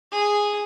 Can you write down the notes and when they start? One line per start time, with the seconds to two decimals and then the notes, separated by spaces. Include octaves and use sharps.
0.11 G#4